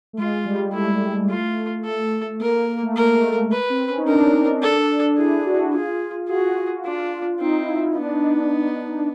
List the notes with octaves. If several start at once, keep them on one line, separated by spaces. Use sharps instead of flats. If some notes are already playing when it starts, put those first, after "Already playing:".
A3
G#3 F4
G3
A3 E4
F4
A4
A#3 A#4
A#3
A#3
A3
A#3 A#4
A3
G#3
A3
B4
C4
C#4
D#4
D4 A#4
A4
E4 G#4
F#4
E4
F4 G#4
F#4 G#4
D4 F4
C4 D#4
E4
D#4
B3 D4
D#4
D4
D4
D4